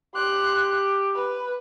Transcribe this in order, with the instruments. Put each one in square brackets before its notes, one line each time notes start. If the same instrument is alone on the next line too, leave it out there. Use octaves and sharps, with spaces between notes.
[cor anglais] G4 [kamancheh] C6 F#6
[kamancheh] B4